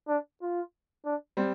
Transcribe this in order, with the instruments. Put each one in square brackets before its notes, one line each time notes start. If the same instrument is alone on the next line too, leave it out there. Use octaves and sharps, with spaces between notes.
[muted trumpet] D4
F4
D4
[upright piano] G3 C4